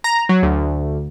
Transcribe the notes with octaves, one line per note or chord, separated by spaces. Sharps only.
A#5
F#3
D2